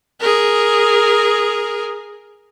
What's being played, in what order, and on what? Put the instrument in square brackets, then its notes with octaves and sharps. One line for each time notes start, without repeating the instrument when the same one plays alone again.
[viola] G#4 A#4